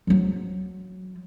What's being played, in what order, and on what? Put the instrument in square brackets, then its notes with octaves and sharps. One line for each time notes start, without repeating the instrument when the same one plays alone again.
[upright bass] F3 F#3